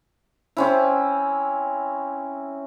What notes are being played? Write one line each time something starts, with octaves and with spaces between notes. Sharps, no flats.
C4 C#4 E4